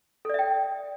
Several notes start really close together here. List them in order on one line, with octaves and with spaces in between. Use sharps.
A4 D5 E5 G5